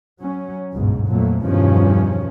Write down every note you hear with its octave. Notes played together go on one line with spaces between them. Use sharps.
F#3 C#4
G1 C#2 G#2 B2
F2 A#2 F#3 A3
E2 G2 B2 D#3 F3 C#4